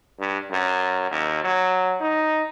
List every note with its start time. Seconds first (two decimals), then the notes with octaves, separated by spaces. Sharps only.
0.20 G2
0.51 F#2
1.11 D#2
1.44 F#3
2.00 D#4